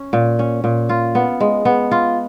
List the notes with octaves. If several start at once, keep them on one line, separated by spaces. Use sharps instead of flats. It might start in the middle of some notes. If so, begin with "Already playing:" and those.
Already playing: C#4
A#2
C#4
A#2
F4
B3
G#3
B3
F4